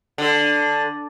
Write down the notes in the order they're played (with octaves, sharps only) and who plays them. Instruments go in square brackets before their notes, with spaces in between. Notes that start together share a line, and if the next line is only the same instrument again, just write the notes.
[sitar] D3